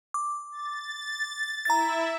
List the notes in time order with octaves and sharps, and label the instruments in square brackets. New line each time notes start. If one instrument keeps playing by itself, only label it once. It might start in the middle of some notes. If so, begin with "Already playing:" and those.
[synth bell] D6
[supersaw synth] A6
[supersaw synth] E4 E5 [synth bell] A#5 A6